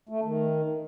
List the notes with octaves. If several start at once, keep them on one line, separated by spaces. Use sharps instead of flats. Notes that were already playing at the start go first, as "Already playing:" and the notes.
A3
D#3